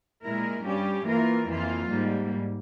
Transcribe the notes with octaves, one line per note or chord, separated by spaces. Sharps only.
A#2 G#3 E4 A#4
G2 G3 C#4 G4
E3 A#3 F4 A#4
F2 E3 A#3 F4
G#2 G3 A#3